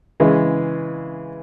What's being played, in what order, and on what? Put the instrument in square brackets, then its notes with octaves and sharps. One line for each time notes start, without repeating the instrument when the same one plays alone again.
[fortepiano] C#3 E3 G#3